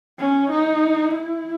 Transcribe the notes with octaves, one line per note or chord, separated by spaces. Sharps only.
C#4
D#4
E4